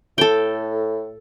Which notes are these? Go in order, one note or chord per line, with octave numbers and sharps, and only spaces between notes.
A2 A4 G5